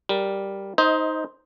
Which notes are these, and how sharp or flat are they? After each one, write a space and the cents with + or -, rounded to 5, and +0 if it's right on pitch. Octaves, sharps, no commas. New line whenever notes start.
G3 +0 A#4 +0
D#4 +10 C5 +0 D#5 +30